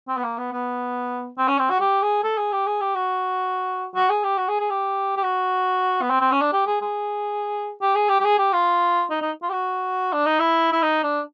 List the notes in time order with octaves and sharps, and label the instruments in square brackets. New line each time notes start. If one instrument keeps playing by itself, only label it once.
[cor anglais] C4
B3
A#3
B3
B3
C4
C#4
C4
F#4
G4
G#4
A4
G#4
G4
G#4
G4
F#4
F#4
G#4
G4
F#4
G#4
G#4
G4
G4
F#4
B3
C4
C4
C#4
D4
G4
G#4
G#4
G4
G#4
G4
G4
G#4
G4
F4
D#4
D#4
F4
G4
F#4
D4
D#4
E4
E4
D#4
D4